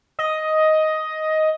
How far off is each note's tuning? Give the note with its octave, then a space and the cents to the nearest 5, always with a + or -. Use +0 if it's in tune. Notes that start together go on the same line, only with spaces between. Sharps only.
D#5 +10